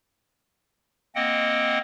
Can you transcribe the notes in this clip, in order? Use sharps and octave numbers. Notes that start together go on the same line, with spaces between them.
A#3 C4 D#5 F#5 G5